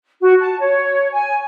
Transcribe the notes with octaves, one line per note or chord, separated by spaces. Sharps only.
F#4
A5
C#5
G#5